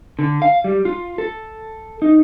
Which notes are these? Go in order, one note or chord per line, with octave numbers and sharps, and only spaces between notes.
D3
F5
G3
F4
A4
D#4